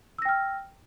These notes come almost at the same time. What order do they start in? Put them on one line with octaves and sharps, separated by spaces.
E6 A#6 G5 F6